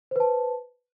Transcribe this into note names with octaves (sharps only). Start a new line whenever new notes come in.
B4 C5 A5